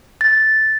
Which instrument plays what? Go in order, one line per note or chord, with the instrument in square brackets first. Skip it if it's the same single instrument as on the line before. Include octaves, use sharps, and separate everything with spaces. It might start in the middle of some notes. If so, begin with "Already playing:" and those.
[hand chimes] A6